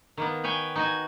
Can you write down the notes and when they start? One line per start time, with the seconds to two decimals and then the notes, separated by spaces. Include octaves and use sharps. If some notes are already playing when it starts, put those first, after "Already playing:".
0.17 D#3 A#3 B3
0.44 B4 C#5 G5 G#5
0.75 D#4 F#4 G#5